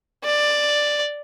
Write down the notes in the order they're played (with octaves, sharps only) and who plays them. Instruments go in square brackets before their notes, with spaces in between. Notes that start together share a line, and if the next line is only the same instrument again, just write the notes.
[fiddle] D5